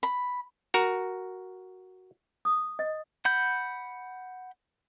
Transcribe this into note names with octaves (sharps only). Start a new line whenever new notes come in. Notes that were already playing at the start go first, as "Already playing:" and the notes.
B5
F#4 A#4
D#6
D#5
F#5 B5 G6